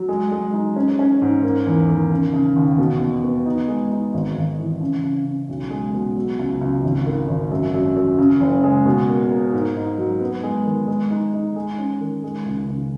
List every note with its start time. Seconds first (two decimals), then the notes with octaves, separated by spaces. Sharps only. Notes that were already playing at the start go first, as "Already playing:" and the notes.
Already playing: F#3
0.09 G#3
0.31 G#3
0.53 D#4
0.76 C#4
0.99 C#4
1.22 G#2
1.43 A#3
1.67 E2
1.89 D#3
2.12 C#3
2.33 C#3
2.56 D#2
2.78 B2
3.01 B2
3.24 B3
3.46 D#4
3.68 G#3
3.92 D#4
4.14 G#1
4.36 G#1
4.58 E3
4.80 C#3
5.04 C#3
5.25 C#3
5.49 B1
5.70 G#3
5.94 B2
6.16 F#3
6.39 C#2
6.61 C#2
6.83 G#1
7.07 D#3
7.28 G#1
7.51 F#2
7.74 F#2
7.96 F#2
8.18 C#3
8.40 F#1
8.64 G#3
8.86 B2
9.08 A#3
9.30 A#3
9.53 G#2
9.76 D#4
9.98 F#3
10.21 B3
10.43 G#3
10.65 D#3
10.88 G#3
11.11 D#4
11.34 D#4
11.56 G#3
11.79 C#4
12.00 D#3
12.24 G#3
12.46 C#2
12.68 C#2